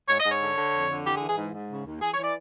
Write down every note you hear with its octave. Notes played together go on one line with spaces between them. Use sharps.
G#2 C#5
D#5
G#2
C#5
D3
D3
F2
D3
E3 G4
G#4
E3
G#4
G#2
G#2
C#3
D#2
E3 G#4
E3 C#5
D5